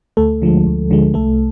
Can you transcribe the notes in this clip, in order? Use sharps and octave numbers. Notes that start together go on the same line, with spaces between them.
D2 A3 A4
D3 F3 G#3
D2
D3 F3 G#3
C2 A3 A4